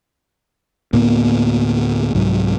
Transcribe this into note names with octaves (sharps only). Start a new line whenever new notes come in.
D2 A2 A#3 B3
C2 G#2 F#3